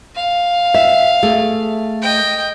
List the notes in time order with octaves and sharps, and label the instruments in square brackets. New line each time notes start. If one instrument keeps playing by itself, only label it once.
[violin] F5
[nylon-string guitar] E5
A3 G#4
[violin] D#5 G5